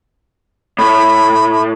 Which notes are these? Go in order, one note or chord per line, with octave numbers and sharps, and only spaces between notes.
A2 B5